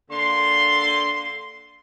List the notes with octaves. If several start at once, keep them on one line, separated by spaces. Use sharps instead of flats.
D3 A#3 D5 C6